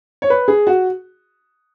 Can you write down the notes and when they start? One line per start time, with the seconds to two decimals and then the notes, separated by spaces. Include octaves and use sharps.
0.22 C#5
0.30 B4
0.48 G#4
0.67 F#4